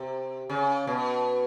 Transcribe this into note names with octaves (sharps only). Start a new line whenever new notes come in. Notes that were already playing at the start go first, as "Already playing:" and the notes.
Already playing: C3
C#3
B2